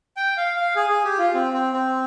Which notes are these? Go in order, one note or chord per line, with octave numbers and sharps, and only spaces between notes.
G5
F5
F5
G#4
G#4
G4
F4
C4
C4
C4